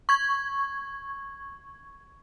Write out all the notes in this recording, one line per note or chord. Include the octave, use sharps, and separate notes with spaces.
C#6 G#6